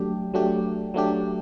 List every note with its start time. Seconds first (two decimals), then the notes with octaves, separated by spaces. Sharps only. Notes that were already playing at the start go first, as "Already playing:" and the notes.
Already playing: F#3 A3 D4 G4
0.34 F#3 A3 D4 G4
0.94 F#3 A3 D4 G4